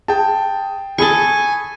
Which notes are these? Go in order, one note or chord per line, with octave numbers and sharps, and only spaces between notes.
G#4 G5 A5
G#4 A4 G#5 B5 C#6 D#6